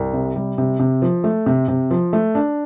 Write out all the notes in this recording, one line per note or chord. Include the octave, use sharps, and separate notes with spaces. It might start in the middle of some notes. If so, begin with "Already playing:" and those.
Already playing: C2
C3
G3
C3
C3
F3
A3
C3
C3
F3
A3
D4